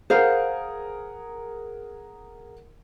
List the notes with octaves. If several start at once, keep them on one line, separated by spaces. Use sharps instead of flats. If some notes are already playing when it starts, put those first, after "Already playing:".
G#4 A#4 C5 F5 F#5